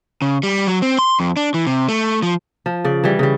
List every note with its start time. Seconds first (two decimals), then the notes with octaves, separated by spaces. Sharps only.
0.22 C#3
0.43 G3
0.67 F#3
0.82 C4
0.99 C6
1.20 F2
1.37 D4
1.54 E3
1.67 C3
1.89 A3
2.23 F3
2.66 F3
2.85 C#3 D5
3.04 E3 G3
3.19 C#3 G3